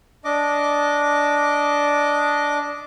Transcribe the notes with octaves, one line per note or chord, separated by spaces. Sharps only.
D4 D#5 D6